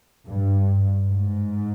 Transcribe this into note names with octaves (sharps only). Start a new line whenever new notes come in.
G2
G#2